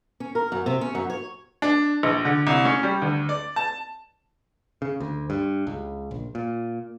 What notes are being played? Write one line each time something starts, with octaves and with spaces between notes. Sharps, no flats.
C#4
A#4
F#2
C3
C#4
F#2
C#5
D4
A#1
D3
C2
C#4
G3
D2
D5
A5
C#3
D2
G2
C#2
A#1
A#2